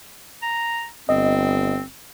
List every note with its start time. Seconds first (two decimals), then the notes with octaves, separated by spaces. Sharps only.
0.42 A#5
1.09 G1 C4 D#5